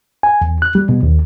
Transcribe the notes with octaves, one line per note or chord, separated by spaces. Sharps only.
G#5
E2
F#6
G3
B2
D#2